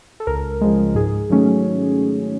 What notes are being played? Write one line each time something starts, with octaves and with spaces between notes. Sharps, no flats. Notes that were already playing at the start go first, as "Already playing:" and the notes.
A4
C#2 A#4
C#3 F3 G#3
G#2 G#4
D#3 F#3 A3 C#4